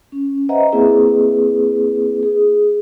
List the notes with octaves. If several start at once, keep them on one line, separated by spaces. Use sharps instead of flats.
C#4
B4 C5 D#5 E5 F#5 A#5
A#3 C4 E4 G#4 B4
G#4